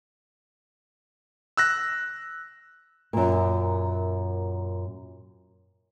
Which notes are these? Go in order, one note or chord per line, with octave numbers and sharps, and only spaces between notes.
E6 F#6 A#6
F#2 A#2